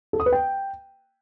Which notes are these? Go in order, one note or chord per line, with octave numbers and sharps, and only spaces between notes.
A4
D#6
B4
G5